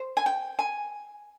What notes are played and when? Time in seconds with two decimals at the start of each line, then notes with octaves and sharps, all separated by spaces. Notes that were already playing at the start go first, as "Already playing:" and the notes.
Already playing: C5
0.17 G#5
0.26 G5
0.59 G#5